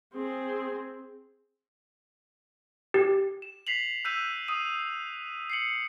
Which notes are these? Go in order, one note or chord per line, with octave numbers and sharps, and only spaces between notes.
C4 G#4
G4
E7
B6 C7 F7 F#7
E6 F#6 G6 B6 D#7
D#6 D#7
C7 C#7 F#7